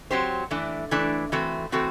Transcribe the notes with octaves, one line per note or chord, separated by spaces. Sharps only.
F#3 C4 G4 C5
E3 A3 D4
E3 A3 D4
E3 A3 C4 F#4
E3 A3 C4 F#4